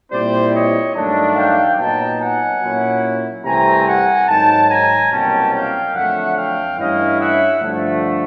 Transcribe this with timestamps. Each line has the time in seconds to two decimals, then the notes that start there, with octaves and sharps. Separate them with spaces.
0.11 A#2 G3 C4 E4 C5 D5
0.53 C#5 D#5
0.94 G2 D#3 F#3 A3 D4
1.36 F5 G5
1.78 A#2 F#3 B3 D#4 G5 A5
2.20 F#5 G#5
2.61 A#2 F#3 A#3 C#4 E4
3.44 C2 C3 E3 A3 C4 G#5 A#5
3.87 F#5 G#5
4.27 G#2 D#3 F#3 G5 A5
4.69 G#5 A#5
5.11 C2 B2 F#3 A#3 C#4 G5 A5
5.53 F5 G5
5.94 F2 D3 F#3 A3 E5 F#5
6.36 F5 G5
6.78 G2 E3 A3 C#4 E4 D#5 F5
7.19 E5 F#5
7.60 G2 D3 F3 A3